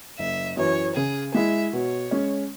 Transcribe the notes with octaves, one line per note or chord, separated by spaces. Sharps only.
F#1 E5
F#2 E3 C#5
C#3 G#4
G#3 E4 E5
B2 C#5
G#3 C#4